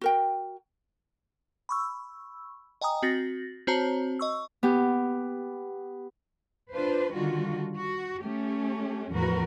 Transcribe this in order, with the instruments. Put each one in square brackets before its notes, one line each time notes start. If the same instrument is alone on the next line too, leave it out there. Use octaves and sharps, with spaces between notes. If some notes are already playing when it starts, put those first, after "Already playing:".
[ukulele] F#4 A#4 G5
[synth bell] B5 C#6 E6
D#5 G5 G#5 A#5 D#6
C4 F#4 A6 A#6
C4 F#4 C5 C#5 A5 A#5
D#5 C#6 E6
[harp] B3 G4
[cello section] D4 F4 B4 C5
D3 D#3 G3 F4 F#4
F#4
A3 C#4 G4
E2 A2 F3 F#4 A#4 B4